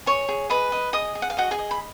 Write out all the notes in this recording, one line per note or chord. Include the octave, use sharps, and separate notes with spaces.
G#4 C#5 C#6
G#4
B4 D#5 B5
D#5
G#4 D#5 D#6
G#4
F#5
F5
F#4 D#5 F#5
G#4 G#5
D#5
B5